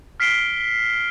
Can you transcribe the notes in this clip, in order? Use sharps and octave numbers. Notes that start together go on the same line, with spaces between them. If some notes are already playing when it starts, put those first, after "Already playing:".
F6 B6 C7 D7 G7